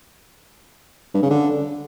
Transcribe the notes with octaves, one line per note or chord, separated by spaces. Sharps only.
G2
C#3
D3